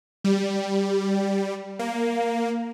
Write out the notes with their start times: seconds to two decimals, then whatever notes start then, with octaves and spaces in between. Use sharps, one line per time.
0.24 G3
1.79 A#3